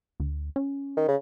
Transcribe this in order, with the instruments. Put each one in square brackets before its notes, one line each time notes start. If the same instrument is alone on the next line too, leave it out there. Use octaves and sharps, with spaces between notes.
[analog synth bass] D2
C#4
[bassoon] D#3
C#3